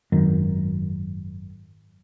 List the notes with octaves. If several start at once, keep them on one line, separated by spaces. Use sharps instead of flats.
G#1 F#2 D#3